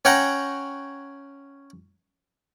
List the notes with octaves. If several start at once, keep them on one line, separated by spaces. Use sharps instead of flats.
C#4 C#5 F#5 G5 A#5